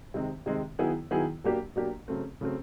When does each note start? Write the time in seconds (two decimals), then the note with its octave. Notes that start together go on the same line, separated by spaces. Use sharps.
0.14 C3 D#3 G#3 C4
0.46 C3 D#3 G#3 C4
0.79 D#3 F#3 B3 E4 G#4
1.11 D#3 F#3 B3 E4 G#4
1.44 B2 F#3 A#3 D4 G4
1.76 B2 F#3 A#3 D4 G4
2.08 C#3 F#3 A3 C4
2.41 C#3 F#3 A3 C4